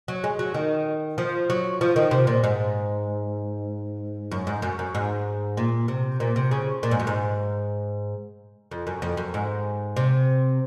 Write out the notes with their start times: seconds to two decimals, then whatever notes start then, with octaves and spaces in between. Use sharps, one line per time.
0.08 F#3
0.24 G#3
0.39 F#3
0.54 D#3
1.18 F3
1.50 F#3
1.81 F3
1.96 D#3
2.11 C3
2.27 A#2
2.44 G#2
4.31 F#2
4.47 G#2
4.62 F#2
4.79 F#2
4.95 G#2
5.57 A#2
5.88 C3
6.20 A#2
6.36 C3
6.51 C#3
6.83 A#2
6.91 G#2
7.00 F#2
7.07 G#2
8.71 F2
8.87 F#2
9.02 F2
9.17 F#2
9.34 G#2
9.97 C3